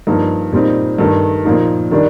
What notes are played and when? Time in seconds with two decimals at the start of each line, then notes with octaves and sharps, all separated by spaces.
0.07 G2 F3 A#3 D#4
0.53 A#2 G3 C4 D#4
0.98 G2 D#3 A3
1.45 A#2 F3 A#3 D#4
1.91 D#3 G3 D4